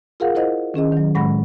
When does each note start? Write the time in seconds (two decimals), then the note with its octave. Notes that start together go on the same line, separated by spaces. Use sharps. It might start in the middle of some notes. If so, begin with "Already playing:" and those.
0.20 F4 G#4 A#4 F5 F#5
0.35 E4 A#4 C5 D#5 F#5
0.74 D#3 C#4 G#4 D#5
0.92 D#3 F#3
1.15 A2 G#3 F#5 B5 A#6